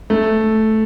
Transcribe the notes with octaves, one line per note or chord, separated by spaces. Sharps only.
A3